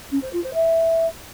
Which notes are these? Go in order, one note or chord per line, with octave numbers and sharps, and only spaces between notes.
C#4
C5
F4
C5
E5